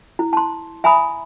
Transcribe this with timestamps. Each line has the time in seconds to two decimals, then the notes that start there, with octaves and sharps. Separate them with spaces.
0.19 E4
0.33 A5 C6
0.84 E5 G#5 A#5 B5 D#6